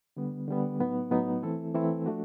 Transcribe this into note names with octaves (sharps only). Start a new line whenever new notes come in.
D3 G3 B3
D3 G3 B3
A2 F#3 B3 D#4
A2 F#3 B3 D#4
E3 A3 C4 E4 A4
E3 A3 C4 E4 A4
F3 A3 D4 F#4